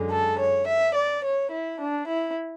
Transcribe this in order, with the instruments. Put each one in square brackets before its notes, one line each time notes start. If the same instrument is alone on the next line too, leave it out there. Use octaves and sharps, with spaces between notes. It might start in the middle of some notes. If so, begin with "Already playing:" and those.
Already playing: [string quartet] F#2 D3 G#3
A4
C#5
E5
D5
C#5
E4
D4
E4